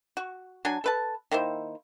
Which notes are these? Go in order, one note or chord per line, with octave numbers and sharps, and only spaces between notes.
F#4
F#3 D4 G#5
A4 B4 A5
D#3 A#3 E4 C5